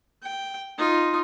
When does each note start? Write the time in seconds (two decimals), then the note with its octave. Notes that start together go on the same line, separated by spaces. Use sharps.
0.23 G5
0.78 D#4 F4